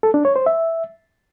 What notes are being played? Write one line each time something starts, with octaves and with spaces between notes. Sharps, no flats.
A4
D4
C#5
C5
E5